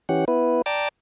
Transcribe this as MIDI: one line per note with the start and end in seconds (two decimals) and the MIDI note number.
0.09 0.25 52
0.09 0.25 61
0.09 0.25 67
0.09 0.25 78
0.28 0.62 59
0.28 0.62 64
0.28 0.62 71
0.66 0.88 74
0.66 0.88 79
0.66 0.88 81
0.66 0.88 82
0.66 0.88 86